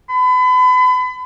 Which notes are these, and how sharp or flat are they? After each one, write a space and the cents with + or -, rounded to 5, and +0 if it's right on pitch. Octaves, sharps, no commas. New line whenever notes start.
B5 +35